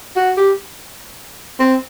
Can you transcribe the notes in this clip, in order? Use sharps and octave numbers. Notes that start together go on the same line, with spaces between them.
F#4
G4
C4